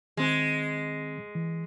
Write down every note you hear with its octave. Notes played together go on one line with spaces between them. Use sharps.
D#3 G#3 C4
E3